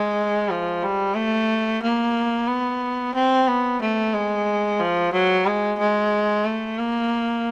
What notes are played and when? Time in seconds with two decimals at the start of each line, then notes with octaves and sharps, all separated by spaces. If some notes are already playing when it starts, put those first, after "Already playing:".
Already playing: G#3
0.50 F3
0.83 G3
1.16 A3
1.82 A#3
2.48 B3
3.14 C4
3.47 B3
3.81 A3
4.14 G#3
4.79 F3
5.13 F#3
5.46 G#3
5.79 G#3
6.45 A3
6.78 A#3